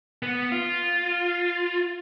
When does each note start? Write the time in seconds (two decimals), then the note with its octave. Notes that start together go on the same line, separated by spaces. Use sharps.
0.23 B3
0.52 F4